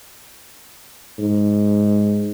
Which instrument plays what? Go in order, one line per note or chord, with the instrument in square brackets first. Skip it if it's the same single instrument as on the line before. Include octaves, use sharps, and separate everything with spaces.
[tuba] G#2